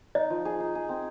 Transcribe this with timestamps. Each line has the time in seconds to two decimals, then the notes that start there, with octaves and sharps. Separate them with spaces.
0.15 D#4 D#5
0.30 F3
0.45 G#4
0.60 D#4
0.75 G#4
0.89 C4